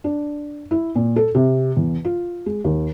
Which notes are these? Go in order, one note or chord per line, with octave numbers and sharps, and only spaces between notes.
D4
E4
A#2
A4
C3
E2
F4
G#3
D#2